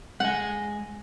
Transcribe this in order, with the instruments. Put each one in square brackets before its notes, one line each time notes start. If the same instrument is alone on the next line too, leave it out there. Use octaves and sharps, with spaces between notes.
[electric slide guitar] G#3 G#5 [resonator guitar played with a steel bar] F#5